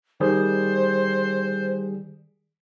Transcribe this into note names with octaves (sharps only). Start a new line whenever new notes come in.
D#3 G3 G#4 C5